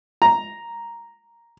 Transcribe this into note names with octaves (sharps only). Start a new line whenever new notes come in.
A#5